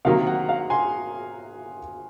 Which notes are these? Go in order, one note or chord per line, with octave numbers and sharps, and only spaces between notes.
C3 D#3 F#3 A#3 F5
F#5
F5
G#5 C6